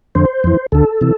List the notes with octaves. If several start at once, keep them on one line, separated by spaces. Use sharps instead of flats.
F2 D3 C5
F2 E3
D2 D3 A4
C3 E3